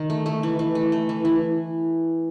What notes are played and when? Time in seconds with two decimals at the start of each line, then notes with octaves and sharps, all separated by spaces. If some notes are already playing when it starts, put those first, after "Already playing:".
Already playing: D#3
0.10 A3
0.26 A3
0.43 E3
0.59 E3
0.75 A3
0.92 A3
1.09 E3
1.25 E3